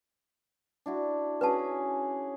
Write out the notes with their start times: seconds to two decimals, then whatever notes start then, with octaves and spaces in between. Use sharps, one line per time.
0.86 D4 E4 F#4
1.41 C#4 F#4 G#4 B4 A5